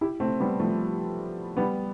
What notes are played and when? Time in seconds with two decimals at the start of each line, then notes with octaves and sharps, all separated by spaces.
0.01 E4 G4
0.20 A3 C4
0.40 G3 B3
0.60 F3 A3
1.57 G3 B3